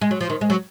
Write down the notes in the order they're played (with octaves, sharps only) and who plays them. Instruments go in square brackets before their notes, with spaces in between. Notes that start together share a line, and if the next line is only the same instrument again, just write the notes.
[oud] G#3
F#3
F3
D#3
G#3
F#3